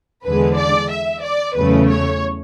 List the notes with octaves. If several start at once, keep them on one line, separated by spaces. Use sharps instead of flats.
E2 D3 G#3 B4
D5
E5
D5
E2 C#3 F#3 A3 B4
C#5